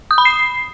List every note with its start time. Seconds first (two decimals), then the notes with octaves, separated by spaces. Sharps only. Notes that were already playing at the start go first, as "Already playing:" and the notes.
0.11 D#6
0.18 B5
0.25 C7